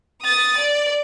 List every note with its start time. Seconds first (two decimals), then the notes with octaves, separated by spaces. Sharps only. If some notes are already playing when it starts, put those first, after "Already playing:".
0.23 D#6 A6
0.58 D5